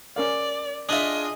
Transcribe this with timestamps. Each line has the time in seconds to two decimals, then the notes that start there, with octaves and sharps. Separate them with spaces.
0.16 C#4 A#4 D5 F5
0.89 D4 F4 G#4 D#5 E5 A5 D#6